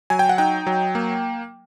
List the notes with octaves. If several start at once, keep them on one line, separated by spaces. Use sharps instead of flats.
F#3 G#5
G5
F#5
D#4 G5
F#3
A#3